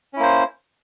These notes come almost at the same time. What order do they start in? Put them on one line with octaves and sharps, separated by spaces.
C#4 E4 A#3 C5